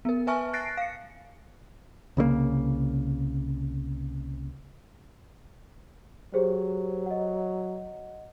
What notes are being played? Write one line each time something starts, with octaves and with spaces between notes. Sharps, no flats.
B3 A#4
B4 E5 G#5 A5 C#6 F6
F#6 A6 A#6 C7 D7
F5 C#7
C2 C#3 G#3 A#3
F#3 G4 G#4 C5
D#5 F#5